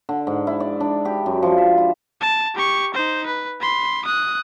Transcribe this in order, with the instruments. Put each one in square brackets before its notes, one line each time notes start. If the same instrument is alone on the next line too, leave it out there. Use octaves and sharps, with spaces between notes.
[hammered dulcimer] D3
G#2
E4
D5
D4
G4
F#2
F3
E5
E4
[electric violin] A5
G4 C#6
D#4 C5
B4
B5 C6
D#6 F#6